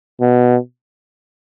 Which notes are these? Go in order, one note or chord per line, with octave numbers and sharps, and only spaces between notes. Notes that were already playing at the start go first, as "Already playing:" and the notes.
B2